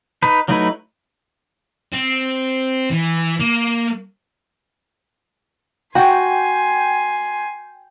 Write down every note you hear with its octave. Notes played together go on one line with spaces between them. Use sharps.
D#4 B4
F#3 A3 D#4 E4 B4
C4
E3
A#3
F#4 G5 G#5 C6